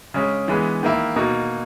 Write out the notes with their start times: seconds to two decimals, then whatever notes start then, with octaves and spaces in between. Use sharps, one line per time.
0.14 C#3 G#3 C#4
0.48 E3 G#3 B3
0.83 D#3 A#3 E4
1.16 B2 A#3 D#4